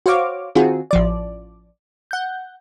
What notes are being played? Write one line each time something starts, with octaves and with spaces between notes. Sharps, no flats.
F#4 C5 C#5 F5 D6
D#3 C4 F4 F#4 G#4
A1 F3 D5
F#5 G6